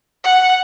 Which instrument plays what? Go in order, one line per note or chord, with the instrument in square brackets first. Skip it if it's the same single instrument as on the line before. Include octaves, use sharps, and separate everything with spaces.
[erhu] F#5